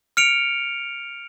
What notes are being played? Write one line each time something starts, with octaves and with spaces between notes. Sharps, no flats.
F6 C#7 D7 F7